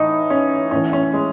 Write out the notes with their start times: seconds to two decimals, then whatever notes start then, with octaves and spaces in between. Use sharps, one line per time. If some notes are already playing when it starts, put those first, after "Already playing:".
Already playing: A2 E3 D#4
0.30 C#4
0.71 A2 E3 C#4
0.93 C#4
1.13 G#3